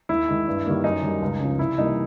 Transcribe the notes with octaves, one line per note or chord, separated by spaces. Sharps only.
D#2 E4
D#3 G#3
G2
D#3 G3 A#3
F#2 D#4
D#3 G3
C#2
C#3 F3
C2 E4
C3 E3 G3 A#3 D#4